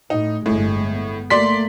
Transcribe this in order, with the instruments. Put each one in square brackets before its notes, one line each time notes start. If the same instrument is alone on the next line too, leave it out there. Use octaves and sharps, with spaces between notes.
[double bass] A2 [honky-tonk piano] D#4
[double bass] G1 G#3 [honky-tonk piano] A2
[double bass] B3
[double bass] A3 A#3 [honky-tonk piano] D5 C6 B6